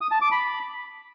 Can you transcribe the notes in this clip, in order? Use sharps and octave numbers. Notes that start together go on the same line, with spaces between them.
D#6
A5
D6
B5